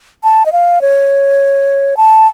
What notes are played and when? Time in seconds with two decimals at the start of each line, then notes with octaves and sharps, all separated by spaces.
0.23 A5
0.46 D#5
0.52 F5
0.81 C#5
1.97 A5